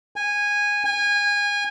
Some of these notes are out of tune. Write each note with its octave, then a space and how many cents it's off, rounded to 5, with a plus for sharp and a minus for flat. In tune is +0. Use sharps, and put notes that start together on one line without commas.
G#5 -15
G#5 -25